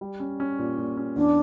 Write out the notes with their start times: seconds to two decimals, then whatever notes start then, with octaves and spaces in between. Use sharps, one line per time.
0.01 G3
0.20 C#4
0.40 C#4
0.59 A#2
0.78 A#2
0.97 C#4
1.16 E2 D4